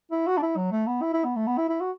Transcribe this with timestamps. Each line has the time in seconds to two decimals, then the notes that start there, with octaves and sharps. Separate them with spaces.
0.11 E4
0.27 F#4
0.38 D4
0.42 E4
0.57 F#3
0.71 A3
0.87 B3
1.02 E4
1.13 E4
1.24 B3
1.36 A3
1.47 B3
1.58 E4
1.69 E4
1.81 F#4